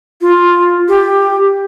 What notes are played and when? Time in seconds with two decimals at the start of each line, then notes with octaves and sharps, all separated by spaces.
0.21 F4
0.88 G4